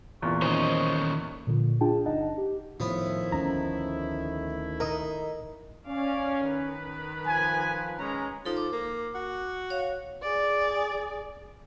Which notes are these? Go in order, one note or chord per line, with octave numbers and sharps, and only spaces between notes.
E2 A#2 C#6
D#3 C#4 C5 D#5
A#2 D3 F3
D4 F4 G#4 G5 A5
G1 D4 D#4 D#5 F#5 A5
G4
A2 D#3 F3 A3 B3 E4
D2 C#4 A#5
D#4 A#4 D#5 D#6
C#4 D5 F5
D#3 B4
F3 G#5
G#3 C#4 A#5
F3 D#4 A4
D6
A#3
F#4
C#5 F5
G#4 D5